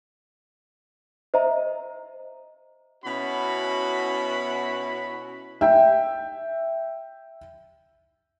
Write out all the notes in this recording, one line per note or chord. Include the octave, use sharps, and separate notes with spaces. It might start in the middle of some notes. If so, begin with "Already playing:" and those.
C5 D#5 E5 A#5
B2 C#4 E4 F#4 B5
E5 G5